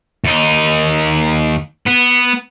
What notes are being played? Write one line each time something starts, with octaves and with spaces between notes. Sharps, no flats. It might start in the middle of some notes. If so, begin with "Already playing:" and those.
D#2 D#4
B3